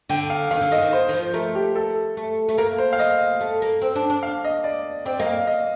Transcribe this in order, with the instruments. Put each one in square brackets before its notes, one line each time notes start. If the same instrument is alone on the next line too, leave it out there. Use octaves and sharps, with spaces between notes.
[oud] D3 [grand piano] G5
[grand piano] F5
[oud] D#3 [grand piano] F5
[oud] D3
[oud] D#3 [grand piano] D#5
[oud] D#3
[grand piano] C5
[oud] D#3
F3
[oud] A3 [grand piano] A#4
[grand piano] G4
A4
[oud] A3
A3
[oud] A#3 [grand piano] A#4
[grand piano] C5
F5
D#5
[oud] A3
A#3
C4
D4
D4
[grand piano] F5
D#5
D5
[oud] C4 [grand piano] D5
[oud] A#3 [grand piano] D#5
[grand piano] F5
D#5